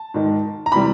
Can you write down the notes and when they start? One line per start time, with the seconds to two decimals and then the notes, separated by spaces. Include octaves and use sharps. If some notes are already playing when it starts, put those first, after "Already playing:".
Already playing: A5
0.14 G#2 D#3 G#3
0.66 A#5
0.72 C3 E3 G3 B5